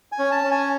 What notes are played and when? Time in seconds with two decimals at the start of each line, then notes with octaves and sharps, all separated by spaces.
0.12 G#5
0.19 C#4
0.32 A5
0.44 C#4
0.51 G#5